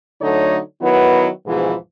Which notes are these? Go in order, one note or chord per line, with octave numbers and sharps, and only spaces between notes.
D3 F#3 A3 D#4 A4 C#5
D#3 F#3 B3 E4 B4
D2 G#2 B2 E3 F3 G#4